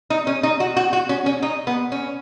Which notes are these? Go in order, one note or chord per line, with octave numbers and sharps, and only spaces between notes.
D#4
C#4
D#4
F#4
F#4
F#4
C#4
C#4
D#4
B3
C#4